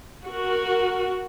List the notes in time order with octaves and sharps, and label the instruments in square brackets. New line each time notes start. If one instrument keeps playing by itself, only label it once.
[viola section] F#4 A#4